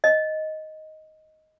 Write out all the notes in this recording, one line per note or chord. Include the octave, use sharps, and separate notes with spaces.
D#5